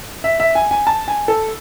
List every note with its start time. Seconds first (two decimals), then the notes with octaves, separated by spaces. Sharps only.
0.24 E5
0.40 E5
0.55 G#5
0.71 G#5
0.87 A5
1.08 G#5
1.28 A4